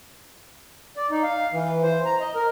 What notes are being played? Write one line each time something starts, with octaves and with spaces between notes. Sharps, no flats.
D5
D#4
F5
E3
C5
A#5
D#5
A#4